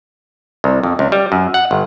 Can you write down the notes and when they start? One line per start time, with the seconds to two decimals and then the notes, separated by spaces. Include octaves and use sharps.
0.64 C2
0.83 F2
0.99 C#2
1.12 G3
1.32 F#2
1.54 F#5
1.71 G1